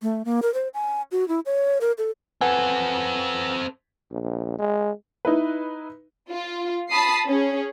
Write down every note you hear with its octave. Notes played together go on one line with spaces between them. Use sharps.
A3
A#3
A#4
C5
G#5
F#4
E4
C#5
A#4
A4
C4 A4 B4 F#5 G#5
A#1
G#3
D#4 E4 B4
F4
A5 B5 D#6 C7
C#4 G#4